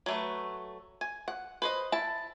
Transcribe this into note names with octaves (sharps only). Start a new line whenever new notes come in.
F#3 A3 B4
G#5
F#5
B4 C5 D#5
E4 A5